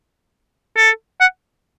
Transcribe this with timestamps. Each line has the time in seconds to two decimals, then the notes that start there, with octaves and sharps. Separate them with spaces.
0.77 A4
1.21 F#5